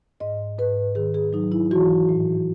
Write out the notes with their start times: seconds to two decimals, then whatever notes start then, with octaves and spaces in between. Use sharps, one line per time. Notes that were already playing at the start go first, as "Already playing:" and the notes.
0.20 G#2 D#5
0.58 G#2 B4
0.95 D#3 G#4
1.14 G#4
1.33 F#3 D#4
1.52 E4
1.71 E3 F#4
2.09 A2